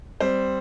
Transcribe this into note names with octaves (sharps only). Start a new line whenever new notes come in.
G3 C4 C5